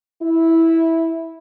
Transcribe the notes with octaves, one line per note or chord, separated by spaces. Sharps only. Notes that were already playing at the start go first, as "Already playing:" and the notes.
E4